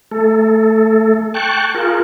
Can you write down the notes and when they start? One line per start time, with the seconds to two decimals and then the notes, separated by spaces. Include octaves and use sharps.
0.11 A3 A4
1.34 G5 A5 C#6 F#6
1.75 F4 G#4 A#4